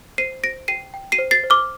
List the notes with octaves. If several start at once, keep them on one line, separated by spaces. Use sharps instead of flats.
C5 C7 D#7
C5 A#6 D7
G5 C7 D#7
G5
C7 D#7
C5
A6 C7
C5
D6 F6